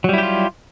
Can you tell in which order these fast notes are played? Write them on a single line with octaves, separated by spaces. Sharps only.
F#3 G3 E4 G4 F4